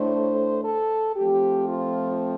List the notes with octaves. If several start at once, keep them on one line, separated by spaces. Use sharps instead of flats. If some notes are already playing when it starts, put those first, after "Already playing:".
Already playing: A2 A3 D4 C5
A4
F3 A3 C4 G4
F4